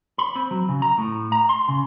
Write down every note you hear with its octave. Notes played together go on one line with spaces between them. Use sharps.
B5
C4
F#3
C#3
A#5
A2
A#5
C6
C#3